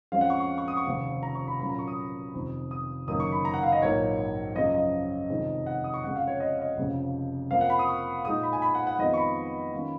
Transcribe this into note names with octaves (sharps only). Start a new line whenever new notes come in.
F2 F3 G#3 C#4 F4 F5
F#5
C#6
C#6
C#6
D#6
C#6
F1 D#2 C#3 F3
A#5
C#6
B5
A#2 F#3 A#3 C#4 F4 B5
A#5
C#6
D#6
F1 F2 D#3
D#6
F#1 F#2 D#3 A#3 D#4 D#6
C#6
B5
A#5
F#5
F5
D#5
A#1 G#2 F#3 A#3 D#4 C#5
F#2 C#3 F3 D#5
D#5
F1 F2 D#3 G#3 D#4
F#5
D#6
C#6
F2 C#3 G#3 F#5
F5
C#5
D#5
D#5
F1 F2 C#3
F2 F3 A#3 F5
F#5
B5
D#6
C#6
A#2 G#3 D#4 D#6
B5
G#5
B5
F#5
F#5
F2 D#3 G#3 B3 F4 D#5
C#6
B5
D#3 A#3 C#4 F4